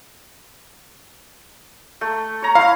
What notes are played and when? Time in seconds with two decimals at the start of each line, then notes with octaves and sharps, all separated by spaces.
2.01 A3
2.42 C#5 A#5
2.55 E4 F5